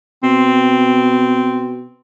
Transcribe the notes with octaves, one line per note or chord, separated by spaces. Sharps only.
B2 C4